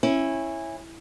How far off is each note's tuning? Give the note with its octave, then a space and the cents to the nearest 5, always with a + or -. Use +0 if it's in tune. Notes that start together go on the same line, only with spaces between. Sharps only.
C#4 -20 E4 +0